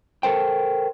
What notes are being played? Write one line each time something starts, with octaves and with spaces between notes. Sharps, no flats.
A4 A#4 C5 G5